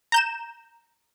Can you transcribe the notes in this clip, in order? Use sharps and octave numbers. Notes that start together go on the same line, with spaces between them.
A#5 G6 E7